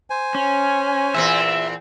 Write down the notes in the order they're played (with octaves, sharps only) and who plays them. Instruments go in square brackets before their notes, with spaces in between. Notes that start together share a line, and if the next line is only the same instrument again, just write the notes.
[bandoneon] C5 G#5
[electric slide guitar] C#4
[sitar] E2 A#2 C4 [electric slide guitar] E5